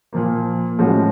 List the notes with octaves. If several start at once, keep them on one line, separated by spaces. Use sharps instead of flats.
A#2 F3 A#3
A2 F3 G#3 C#4 F#4